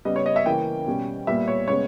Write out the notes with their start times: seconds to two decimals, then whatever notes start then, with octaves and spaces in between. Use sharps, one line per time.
0.05 C#3 G3 B3 D#5
0.16 C#5
0.26 D#5
0.36 E5
0.46 C#3 E3 A#3 C#4 G5
0.87 B2 G3 C#4
1.27 A#2 G3 B3 E5
1.48 C#5
1.68 C#3 G#3 B3 C#5